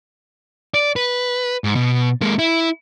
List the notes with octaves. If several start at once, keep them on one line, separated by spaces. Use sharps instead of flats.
D5
B4
G#2
B2
G#3 A#3
E4